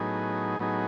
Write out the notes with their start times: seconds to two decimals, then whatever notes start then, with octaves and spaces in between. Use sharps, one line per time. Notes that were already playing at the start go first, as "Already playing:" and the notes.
Already playing: A2 F#3 B3 D#4 G#4
0.59 A2 F#3 B3 D#4 G#4